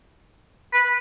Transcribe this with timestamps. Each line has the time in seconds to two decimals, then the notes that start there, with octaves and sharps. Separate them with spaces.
0.73 B4